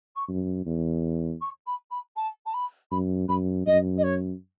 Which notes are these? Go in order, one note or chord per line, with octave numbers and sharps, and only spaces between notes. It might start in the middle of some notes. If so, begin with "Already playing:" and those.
C#6
F#2
E2
C#6
B5
B5
A5
A5
B5
F#2 B5
F#2 B5
F#2 D#5
D#5
C#5